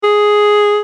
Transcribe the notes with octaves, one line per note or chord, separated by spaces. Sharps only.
G#4